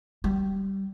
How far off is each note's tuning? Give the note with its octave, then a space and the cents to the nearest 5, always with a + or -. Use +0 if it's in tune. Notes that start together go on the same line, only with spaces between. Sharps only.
G3 -10